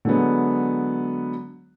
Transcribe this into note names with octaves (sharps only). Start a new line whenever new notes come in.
D3 F#3 G#3 B3